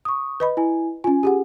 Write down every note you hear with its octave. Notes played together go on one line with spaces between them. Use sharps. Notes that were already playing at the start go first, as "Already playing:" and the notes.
C#6 D#6
B4 D#5 B5
E4 G#5
C#4 F4 G#5
G4 G#4 F#5